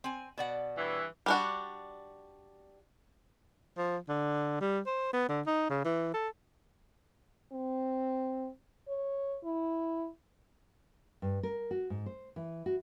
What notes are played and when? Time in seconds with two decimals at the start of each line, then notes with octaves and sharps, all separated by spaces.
0.04 C4 G#5
0.38 B2 D5 F#5
0.78 G2 E3
1.26 G3 D4 F#4
3.77 F3
4.09 D3
4.61 G3
4.86 C5
5.13 B3
5.29 D3
5.46 D#4
5.70 C#3
5.85 E3
6.14 A4
7.52 C4
8.88 C#5
9.43 E4
11.22 G2
11.43 A#4
11.71 F#4
11.90 G#2
12.06 C5
12.36 E3
12.66 F#4